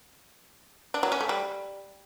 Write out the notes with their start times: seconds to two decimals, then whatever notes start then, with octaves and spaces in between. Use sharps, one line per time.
0.94 D4
1.03 F#3
1.12 C#4
1.20 A3
1.29 G3